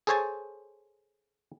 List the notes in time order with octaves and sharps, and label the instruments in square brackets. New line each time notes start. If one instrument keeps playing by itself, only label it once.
[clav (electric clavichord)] G#4 A4 C5 C#5 G#5 A5